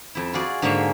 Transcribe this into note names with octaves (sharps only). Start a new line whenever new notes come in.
F2 E4
F4 F#4 G#4 D5
G#2 D3 G#3 A#3 C#5 E5